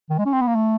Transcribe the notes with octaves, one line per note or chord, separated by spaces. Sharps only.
D#3
G#3
C#4
C4
B3
A#3
A3